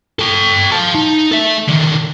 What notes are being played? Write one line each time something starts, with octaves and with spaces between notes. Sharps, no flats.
A4 G5
F5 A5
D#4
A4 E5
D3 D#3